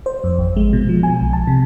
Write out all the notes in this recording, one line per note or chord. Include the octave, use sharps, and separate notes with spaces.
C5
F2
G#1
G#3
B2
F3
G#5
B1
A5
C3